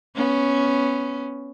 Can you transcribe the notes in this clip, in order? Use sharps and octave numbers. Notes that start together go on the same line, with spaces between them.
B3 C#4